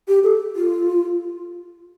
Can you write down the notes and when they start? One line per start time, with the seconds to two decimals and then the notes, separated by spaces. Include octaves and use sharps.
0.08 G4
0.24 A4
0.56 F4